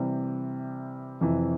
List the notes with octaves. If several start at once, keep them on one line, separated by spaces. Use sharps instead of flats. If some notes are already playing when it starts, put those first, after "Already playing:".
Already playing: C3 E3 G3
F2 C3 E3